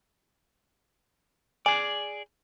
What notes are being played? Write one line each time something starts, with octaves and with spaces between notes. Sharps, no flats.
G#4 D5 G#5